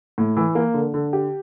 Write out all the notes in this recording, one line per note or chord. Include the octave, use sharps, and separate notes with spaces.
A2
E3
A#3
D3
D3
G4